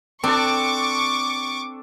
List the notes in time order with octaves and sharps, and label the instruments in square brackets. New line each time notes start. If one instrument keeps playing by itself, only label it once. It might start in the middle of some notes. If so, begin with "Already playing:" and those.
[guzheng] C4 [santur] D4 A4 [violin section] C#6 D6